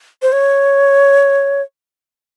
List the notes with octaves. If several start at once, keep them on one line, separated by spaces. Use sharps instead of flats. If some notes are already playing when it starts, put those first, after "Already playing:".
C5
C#5